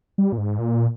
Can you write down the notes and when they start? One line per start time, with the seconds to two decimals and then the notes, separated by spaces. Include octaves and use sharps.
0.18 G3
0.32 A#2
0.38 G#2
0.59 A#2